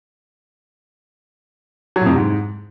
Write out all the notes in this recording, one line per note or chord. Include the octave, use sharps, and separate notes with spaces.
F#3
A2
F2
C3
G#2